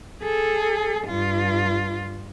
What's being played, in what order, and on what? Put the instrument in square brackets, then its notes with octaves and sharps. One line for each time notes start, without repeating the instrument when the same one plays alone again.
[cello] G#4 A4
G2 F4